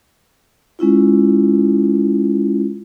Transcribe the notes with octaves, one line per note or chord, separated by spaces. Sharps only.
G#3 C#4 E4 F4